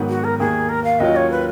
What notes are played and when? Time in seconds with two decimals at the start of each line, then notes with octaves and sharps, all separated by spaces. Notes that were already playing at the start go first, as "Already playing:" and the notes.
Already playing: G#2 D#3 F#3 B3
0.09 F#4
0.24 A#4
0.39 D#2 D#3 A#3 G#4
0.69 A#4
0.84 F5
1.00 D#2 D#3 F#3 C#4 F4 D#5
1.16 C#5
1.31 B4